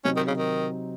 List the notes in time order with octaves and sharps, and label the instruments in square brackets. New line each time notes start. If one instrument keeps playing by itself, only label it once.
[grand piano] C3 F#3 C4 D#4 [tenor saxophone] C#4
[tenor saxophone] D#3
C#3
D#3